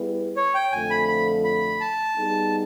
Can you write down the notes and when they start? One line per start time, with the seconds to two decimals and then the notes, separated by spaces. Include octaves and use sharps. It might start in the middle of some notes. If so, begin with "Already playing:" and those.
Already playing: G3 B3 E4 G#4 B4
0.37 C#5
0.54 G5
0.72 F2 D3 F3 A3 G#5
0.90 B5
1.08 B5
1.44 B5
1.80 A5
2.17 G3 B3 D#4 G#4